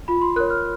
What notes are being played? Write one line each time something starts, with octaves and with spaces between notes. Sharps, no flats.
F4 B5
C6
A#4 C#5 F#6
F6